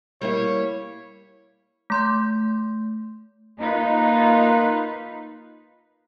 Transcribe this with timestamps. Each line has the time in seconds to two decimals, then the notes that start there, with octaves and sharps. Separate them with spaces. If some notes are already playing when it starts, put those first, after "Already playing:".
0.21 G3 A#3 E4 C#5
1.90 A3 C6 G6
3.58 A#3 D#4 F4 B4